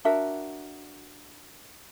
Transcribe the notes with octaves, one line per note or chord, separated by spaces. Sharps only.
D4 F#4 A#4 E5